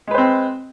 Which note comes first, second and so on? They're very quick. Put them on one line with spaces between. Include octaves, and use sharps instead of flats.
G#3 B4 C5 C4